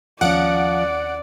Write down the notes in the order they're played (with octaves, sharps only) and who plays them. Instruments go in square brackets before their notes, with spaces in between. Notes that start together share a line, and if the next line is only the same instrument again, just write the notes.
[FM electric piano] D#2 C#4 [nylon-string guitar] F3 [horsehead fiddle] D5 [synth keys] F#5 D7